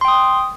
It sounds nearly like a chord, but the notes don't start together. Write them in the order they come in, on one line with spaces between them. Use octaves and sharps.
C6 G5 D#6